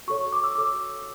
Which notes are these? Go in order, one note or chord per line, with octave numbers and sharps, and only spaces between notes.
F#4 A4 C#5 C#6
C#6
D6
E6
F#4 A4 C#5 D6